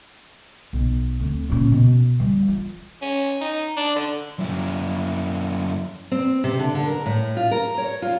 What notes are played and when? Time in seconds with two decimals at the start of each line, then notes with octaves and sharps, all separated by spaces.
0.73 B1
1.20 D2 C4
1.49 A#2 C#4
1.72 B2
2.20 E3 G3
2.48 F4
3.02 C#4
3.41 D#4
3.77 D4
3.96 D3
4.39 F#2 E4
6.12 C4
6.44 C3
6.59 D3
6.75 D3
6.86 A#4
7.06 A2
7.37 F4
7.51 A#4
7.78 C#5
8.02 F4